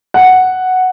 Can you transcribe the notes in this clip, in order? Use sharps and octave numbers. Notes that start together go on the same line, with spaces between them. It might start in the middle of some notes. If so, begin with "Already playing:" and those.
F#5